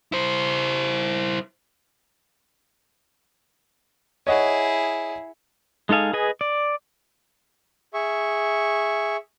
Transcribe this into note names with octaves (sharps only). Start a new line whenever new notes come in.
E4 C5
E4 G#4 C#5 D#5 F#5
G#3 D#4 A4 F5 G#5
G#4 B4 D#5 G#5
D5
G#4 E5 C#6